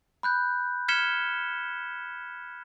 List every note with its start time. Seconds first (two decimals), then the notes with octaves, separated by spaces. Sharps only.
0.23 B5 F#6 G6
0.88 F6 G#6 B6 C#7 E7 G7